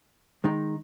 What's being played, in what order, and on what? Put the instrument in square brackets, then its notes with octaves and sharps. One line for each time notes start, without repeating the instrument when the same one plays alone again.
[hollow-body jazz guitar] D#3 G#3 D#4